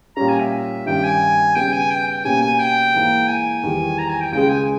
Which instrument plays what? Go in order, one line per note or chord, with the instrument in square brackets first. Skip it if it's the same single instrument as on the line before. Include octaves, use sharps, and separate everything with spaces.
[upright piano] A#2 G3 C#4 [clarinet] A#5
[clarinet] G#5
E5
[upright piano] G2 D#3 G3 C#4 [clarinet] G5
[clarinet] G#5
[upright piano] C#3 G3 B3 [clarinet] G5
[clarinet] G#5
G5
G5
[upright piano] B2 A#3 C#4 G4 [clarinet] G#5
[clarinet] G#5
G5
[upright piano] G#2 E3 A#3
[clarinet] G#5
[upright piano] E2 D#3 G3
[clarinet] A#5
G#5
G5
[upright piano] C#2 C#3 G#3 [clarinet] G5
[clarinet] G#5